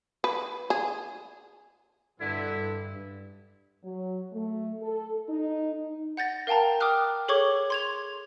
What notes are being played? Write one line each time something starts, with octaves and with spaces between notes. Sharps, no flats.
B4
G#4
G2 B2 D3 E4
F#3
A3
A4
D#4
F#5 G6 A6 A#6
A#4 F5 G5 A5 A#5
G5 D6 D#6 F6 F#6
G#4 A4 C#5 C#6 D6 G#6
C6 G#6 F7